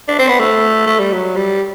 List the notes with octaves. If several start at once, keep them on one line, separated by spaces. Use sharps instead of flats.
D4
C4
B3
A3
A3
G3
F#3
G3